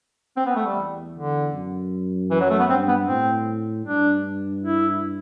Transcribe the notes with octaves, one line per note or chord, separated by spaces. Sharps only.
C4
B3
A3
G3
E2
D3
F#2
E3
F#3
A3
B3
G2 C4
B3
A2 C4
G2 D4
E4